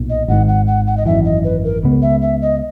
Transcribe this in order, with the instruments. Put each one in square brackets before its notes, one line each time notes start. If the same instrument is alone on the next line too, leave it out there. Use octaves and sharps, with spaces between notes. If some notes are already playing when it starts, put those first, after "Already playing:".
Already playing: [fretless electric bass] B1 A#2
[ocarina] D#5
[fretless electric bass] G#1 G#2 D#3 [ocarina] F#5
[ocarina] F#5
F#5
F#5
D#5
[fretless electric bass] G#1 F#2 E3 [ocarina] E5
[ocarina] D#5
B4
A#4
[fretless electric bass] C#2 C#3 G#3 B3
[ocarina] E5
E5
D#5